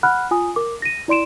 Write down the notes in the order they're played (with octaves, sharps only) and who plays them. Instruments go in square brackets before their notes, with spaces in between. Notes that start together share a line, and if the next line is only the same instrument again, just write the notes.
[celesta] F#5 B5 F6 F#6
F4 G#5 D#6
A#4 D6
A#6 D#7
E4 D5 C6 D7 E7